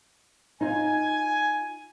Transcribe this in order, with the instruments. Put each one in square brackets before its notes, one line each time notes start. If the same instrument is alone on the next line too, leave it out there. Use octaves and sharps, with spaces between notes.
[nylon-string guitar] D#4 F4 [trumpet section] G#5